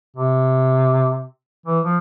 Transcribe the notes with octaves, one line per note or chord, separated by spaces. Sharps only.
C3
E3
F3